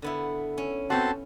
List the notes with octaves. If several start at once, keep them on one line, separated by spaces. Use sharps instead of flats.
D3 B3 E4
C#4
B3 C4 F#4 A4 A5 C6